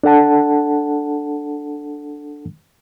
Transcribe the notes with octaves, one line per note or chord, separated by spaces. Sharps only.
D4 A4 F#5 A5